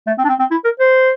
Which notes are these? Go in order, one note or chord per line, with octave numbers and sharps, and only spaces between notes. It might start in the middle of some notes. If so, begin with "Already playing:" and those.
A3
C4
D4
C4
C4
E4
A#4
C5